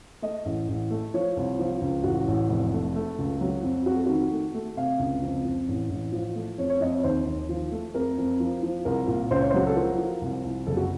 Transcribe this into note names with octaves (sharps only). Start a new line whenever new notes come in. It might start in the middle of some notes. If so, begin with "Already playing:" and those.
A3 D#5
A1
A1
A3
F3 C#5
C2
F3
C#2
A1 F#4
A1
F1
A3
A3
C#2
F#3
F2
F2 F#4
A4
D#3 F#4
A3
A3
C3 F5
C#2
F2
F2
A1
A1
F3
A3
F2 C#5
C#5
F2 D#5
C#5
D#2 C5
D#2
F3
A3
F2 A#4
F2
F3
F3
C2 A#4
A#2
C#2 C5
C#5
F#3 C5
A4
F3 A#4
F3
C2
C2
F#1 A4
F#4